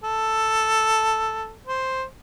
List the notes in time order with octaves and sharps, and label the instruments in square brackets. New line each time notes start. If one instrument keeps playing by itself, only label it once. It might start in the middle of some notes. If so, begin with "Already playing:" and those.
[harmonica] A4
C5